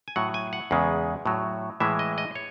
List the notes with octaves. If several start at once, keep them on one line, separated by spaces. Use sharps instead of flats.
G#5
A2 F#3 F#5
G#5
F#5
E2 C#3 G#3
A2 F#3
A2 E3 G#3 E5
D#5
D#5
C#5